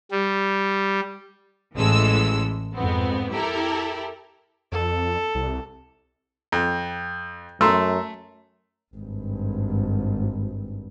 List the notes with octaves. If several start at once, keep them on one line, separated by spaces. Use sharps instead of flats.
G3
A1 E3 G#3 A4 E6
F2 G#2 B3 C4
E4 G4 A4 A#4
F2 A4
C2
F2
F#2 A3 A#5 C6 E6
G#1 G2